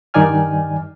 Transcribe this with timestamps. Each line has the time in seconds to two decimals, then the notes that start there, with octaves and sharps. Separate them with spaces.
0.14 G2 D#3 D#4 D5 G#5 F6